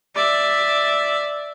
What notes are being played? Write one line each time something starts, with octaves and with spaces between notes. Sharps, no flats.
D5 E5